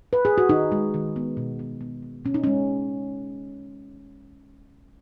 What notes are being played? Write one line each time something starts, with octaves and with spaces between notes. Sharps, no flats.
B4
G#4
F#4
D#3 D#4
G#3
D#3
B3
B2
B3
B3
B2
B2 C#4
D#4
G#3 C#4